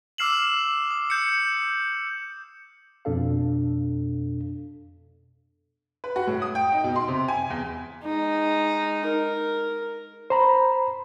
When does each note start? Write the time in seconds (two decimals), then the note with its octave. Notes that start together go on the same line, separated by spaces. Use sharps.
0.18 D6 E6 F6 C7 E7 F#7
0.91 D#6
1.10 G6 C#7
3.05 F2 B2 D4 A4 F5
6.04 B4
6.16 F#4
6.27 A2
6.42 D#6
6.55 G5
6.72 D#4
6.84 B2
6.96 C6
7.08 C3
7.28 G#5
7.50 E2
8.04 G#3 D#4
9.06 A#4
10.30 C5 A#5 B5